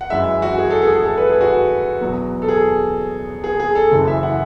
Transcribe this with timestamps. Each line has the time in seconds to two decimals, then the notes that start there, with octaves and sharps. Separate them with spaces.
0.01 F#5
0.10 F#2 E3 G#3 E5
0.42 F#4
0.58 G#4
0.70 A4
0.82 G#4
0.94 G#4
1.06 A4
1.17 B4
1.30 G#4
1.41 F#4
2.01 E2 B2 F#3
2.42 A4
2.48 G#4
3.44 G#4
3.60 G#4
3.75 A4
3.91 F#1 F#2 E3
4.07 E5
4.23 F#5